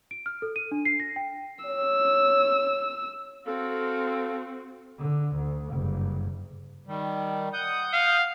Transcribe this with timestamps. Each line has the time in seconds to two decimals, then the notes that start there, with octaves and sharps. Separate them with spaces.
0.11 D7
0.26 F6
0.42 A4
0.56 D#7
0.71 D4
0.85 C7
1.00 A#6
1.16 G5
1.65 C#5 E6
3.47 C4 F#4 A4 F5
4.99 D3
5.36 D2
5.71 F#1 G2
6.87 D#3 G3
7.54 F#5 D#6 G6
7.93 F5